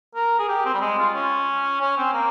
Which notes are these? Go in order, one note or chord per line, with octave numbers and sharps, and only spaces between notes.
A#4
G#4
G4
C4
G3
G#3
F4
C#4
C#4
C4
A#3